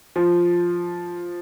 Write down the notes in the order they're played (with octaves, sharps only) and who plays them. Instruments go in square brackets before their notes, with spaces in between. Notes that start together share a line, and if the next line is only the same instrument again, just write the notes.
[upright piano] F3